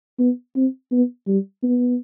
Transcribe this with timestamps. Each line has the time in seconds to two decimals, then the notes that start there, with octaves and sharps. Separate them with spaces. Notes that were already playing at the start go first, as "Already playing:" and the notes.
0.19 B3
0.56 C4
0.92 B3
1.27 G3
1.63 B3